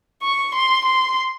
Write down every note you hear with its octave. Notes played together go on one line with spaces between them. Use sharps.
C#6
C6
C6